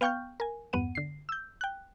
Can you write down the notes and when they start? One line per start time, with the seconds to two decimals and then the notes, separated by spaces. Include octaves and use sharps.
0.01 B3 F5 G5 C#6 F6 G6
0.40 A#4 G#5
0.73 E2 G2 B3 F#5 D#7
0.95 D3 C7
1.29 E6 G6
1.61 G5 F#6